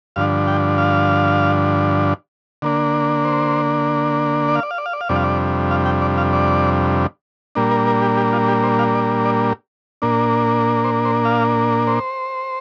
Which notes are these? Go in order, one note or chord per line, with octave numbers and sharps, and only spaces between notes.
G2 D3 F3 D4 F5
G5
F5
D3 A#3 D4
C5
D5
F5
D5
F5
D5
F5
D5
F5
F2 C3 G3 D4 D5
F5
D5
F5
G5
D5
F5
D5
A#2 G3 A#3 D4
A#4
A#4
G4
G4
F4
G4
C5
F5
D5
D5
A#2 A#3 D4
C5
C5
F5
C5